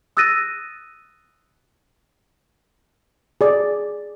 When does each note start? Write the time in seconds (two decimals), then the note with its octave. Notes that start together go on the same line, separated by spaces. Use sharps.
0.17 D#6 E6 F#6 A6 A#6 D#7
3.41 G#4 D5